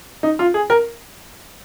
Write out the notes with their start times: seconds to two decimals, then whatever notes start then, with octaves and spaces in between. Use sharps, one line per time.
0.23 D#4
0.39 F4
0.54 G#4
0.70 A#4